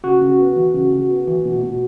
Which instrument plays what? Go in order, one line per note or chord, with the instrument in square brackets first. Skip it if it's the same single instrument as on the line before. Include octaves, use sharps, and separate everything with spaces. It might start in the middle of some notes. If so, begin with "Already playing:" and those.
[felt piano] C#3 [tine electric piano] F#4
[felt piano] C#3
B3
E3
C#3
C#3
B3
E3
B2
B2